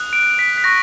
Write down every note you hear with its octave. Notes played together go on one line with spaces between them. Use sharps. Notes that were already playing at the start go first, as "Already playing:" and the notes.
Already playing: D#6 F#6
D7
B6
B6
C#6 F#6 A#6